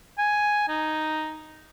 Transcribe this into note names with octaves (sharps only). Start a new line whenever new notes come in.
G#5
D#4